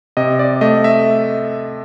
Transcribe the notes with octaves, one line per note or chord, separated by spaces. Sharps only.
C3 D#5
D5
A3 D#5
E5